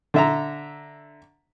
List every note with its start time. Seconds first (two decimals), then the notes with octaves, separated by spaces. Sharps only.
0.14 D3 E5 A#5